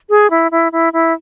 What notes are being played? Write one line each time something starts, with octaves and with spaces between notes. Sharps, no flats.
G#4
E4
E4
E4
E4